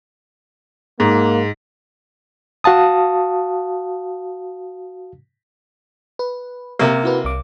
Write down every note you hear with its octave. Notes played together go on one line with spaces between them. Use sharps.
G#2 A#3
F#4 F5 A5 D#6
B4
C3 A#3
E4 F#4 B4
C2 D6